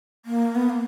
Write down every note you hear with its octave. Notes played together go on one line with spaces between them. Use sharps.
A#3
B3
A#3